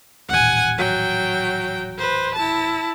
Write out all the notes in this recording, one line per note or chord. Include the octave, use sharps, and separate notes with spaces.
D#1 A1 F#5 G#5
F#3 G5
B4 C5
E4 A5